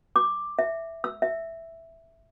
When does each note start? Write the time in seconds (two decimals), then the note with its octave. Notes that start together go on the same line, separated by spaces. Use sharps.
0.16 D6
0.59 E5
1.04 E6
1.22 E5